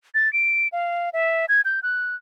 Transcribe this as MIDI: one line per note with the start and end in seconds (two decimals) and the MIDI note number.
0.15 0.31 93
0.33 0.68 98
0.72 1.10 77
1.13 1.46 76
1.49 1.61 92
1.65 1.80 91
1.83 2.15 90